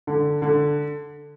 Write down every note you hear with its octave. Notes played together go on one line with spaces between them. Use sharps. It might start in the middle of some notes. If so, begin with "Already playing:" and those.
D3
D3